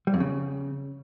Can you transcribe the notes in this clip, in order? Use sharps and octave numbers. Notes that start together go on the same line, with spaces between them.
G3
F2
C#3